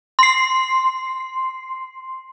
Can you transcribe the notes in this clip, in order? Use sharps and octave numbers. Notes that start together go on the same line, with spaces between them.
C6 C7